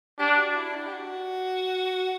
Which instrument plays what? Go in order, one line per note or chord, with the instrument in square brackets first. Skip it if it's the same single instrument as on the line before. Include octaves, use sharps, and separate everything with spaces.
[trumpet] D4 [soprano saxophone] G4
[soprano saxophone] F#4
E4
D4
G4
F#4